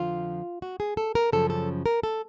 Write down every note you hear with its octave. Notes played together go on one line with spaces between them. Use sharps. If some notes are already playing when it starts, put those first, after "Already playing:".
Already playing: F2 D3 F3 F4
F#4
G#4
A4
A#4
F#2 C#3 F3 A4
A4
A#4
A4